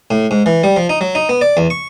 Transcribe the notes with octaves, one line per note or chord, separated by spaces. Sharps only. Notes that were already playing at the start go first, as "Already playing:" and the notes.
A2
G#2
E3
G3
F3
D#4
F#3
D#4
B3
D5
E2
C#6